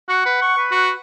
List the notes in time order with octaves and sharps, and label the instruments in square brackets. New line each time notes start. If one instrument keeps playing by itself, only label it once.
[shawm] F#4 [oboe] F#5
[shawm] B4
C#6
[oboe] B4
[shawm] F#4